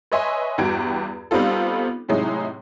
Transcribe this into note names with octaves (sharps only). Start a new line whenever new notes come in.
B4 C#5 D#5 E5 G#5 C6
E2 G2 F#4 G4 G#6 D7
G3 B3 C4 D#4 F4 A4
A2 C3 F#3 G#3 D#4 E4